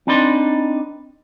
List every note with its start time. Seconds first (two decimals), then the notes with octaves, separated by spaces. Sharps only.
0.07 C4 D4 D#4 B4 D5 C6